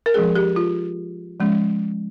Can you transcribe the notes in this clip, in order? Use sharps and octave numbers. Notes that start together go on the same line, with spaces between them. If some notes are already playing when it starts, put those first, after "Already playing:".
A#4
F3 G#3 C#4 G#4
G4
F4
F3 G#3 C#4